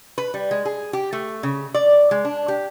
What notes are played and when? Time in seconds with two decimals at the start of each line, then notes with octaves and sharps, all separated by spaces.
0.18 B4
0.34 G3
0.51 G#3
0.65 G#4
0.93 G4
1.13 A3
1.43 C#3
1.74 D5
2.11 G#3
2.25 D4
2.48 G4